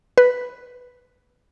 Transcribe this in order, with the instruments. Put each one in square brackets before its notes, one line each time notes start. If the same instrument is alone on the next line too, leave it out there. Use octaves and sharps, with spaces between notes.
[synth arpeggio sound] B4